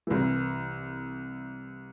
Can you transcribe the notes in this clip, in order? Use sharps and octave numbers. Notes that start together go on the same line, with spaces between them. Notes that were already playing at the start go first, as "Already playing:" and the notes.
C2 E3